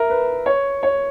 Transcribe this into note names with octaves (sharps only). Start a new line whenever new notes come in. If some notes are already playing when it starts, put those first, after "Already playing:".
Already playing: A#4 E5
B4
C#5
C#5